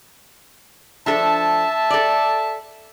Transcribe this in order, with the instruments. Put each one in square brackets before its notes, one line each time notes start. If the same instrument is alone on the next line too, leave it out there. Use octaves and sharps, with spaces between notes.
[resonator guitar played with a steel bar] F3 D4 A4 [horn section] E5 A5
[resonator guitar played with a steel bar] A4 D5